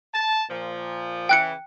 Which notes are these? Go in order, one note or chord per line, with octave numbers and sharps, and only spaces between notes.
A5
A#2 F3
C#3 E3 G5 F#6 C#7